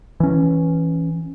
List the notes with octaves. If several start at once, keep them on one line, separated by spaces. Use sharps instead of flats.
E3 C#4